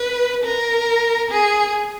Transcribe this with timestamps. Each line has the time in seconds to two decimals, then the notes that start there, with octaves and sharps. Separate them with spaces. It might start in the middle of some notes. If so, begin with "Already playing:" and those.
Already playing: B4
0.44 A#4
1.31 G#4